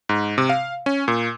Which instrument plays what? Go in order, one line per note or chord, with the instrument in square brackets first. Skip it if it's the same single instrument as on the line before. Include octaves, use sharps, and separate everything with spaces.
[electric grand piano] G#2
C3
F5
C#4
A#2